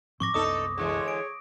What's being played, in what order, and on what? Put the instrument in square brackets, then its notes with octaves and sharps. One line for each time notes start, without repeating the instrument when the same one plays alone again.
[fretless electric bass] G#2 F3 C4 [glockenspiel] C#6 D6 A#6
[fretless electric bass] C2 F#2 B3 [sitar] D4 D#4 A4 [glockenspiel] D#6
[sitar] D3 E3 G#3 [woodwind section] G#4 C#5
[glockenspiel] D7